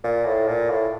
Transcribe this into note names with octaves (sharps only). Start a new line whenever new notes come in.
A#2
A2
A#2
A2